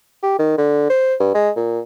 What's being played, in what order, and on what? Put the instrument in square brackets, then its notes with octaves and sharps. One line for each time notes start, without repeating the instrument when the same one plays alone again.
[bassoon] G4
D#3
D3
C5
G2
G#3
A#2